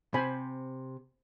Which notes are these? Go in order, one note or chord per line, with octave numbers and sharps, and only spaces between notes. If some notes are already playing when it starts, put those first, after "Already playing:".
C3 C5 G#5 B5